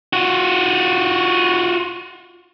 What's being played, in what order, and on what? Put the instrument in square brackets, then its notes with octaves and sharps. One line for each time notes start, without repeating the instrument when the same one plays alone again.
[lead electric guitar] F4 F#4